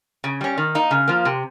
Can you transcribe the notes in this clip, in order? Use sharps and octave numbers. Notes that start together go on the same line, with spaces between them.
C#3
G3 C#4
D#3
A#3 D#4
C#3
F3 A#3
C3